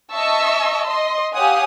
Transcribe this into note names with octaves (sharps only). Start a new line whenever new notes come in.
D#5 E5 A5 C#6 E6
D#5 C6
G4 C#5 F5 F#5 G#5 D#6